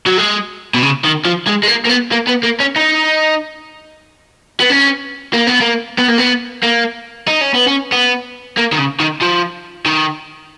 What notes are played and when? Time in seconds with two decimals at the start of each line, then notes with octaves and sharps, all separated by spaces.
0.07 F#3
0.18 G#3
0.74 B2
0.83 C#3
1.04 D#3
1.25 F3
1.47 G#3
1.63 G#3
1.68 A#3
1.85 A#3
1.89 B3
2.12 A#3
2.27 B3
2.43 A#3
2.60 C#4
2.76 D#4
4.60 B3
4.69 C#4
5.34 A#3
5.47 B3
5.61 A#3
5.98 B3
6.08 A#3
6.18 B3
6.63 A#3
7.28 D#4
7.41 C#4
7.54 B3
7.67 C#4
7.92 B3
8.57 A#3
8.72 D#3
8.78 C#3
9.00 D#3
9.22 F3
9.86 D#3